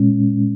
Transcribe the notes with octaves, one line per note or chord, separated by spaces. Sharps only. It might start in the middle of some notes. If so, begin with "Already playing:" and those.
Already playing: A#2 G#3 C#4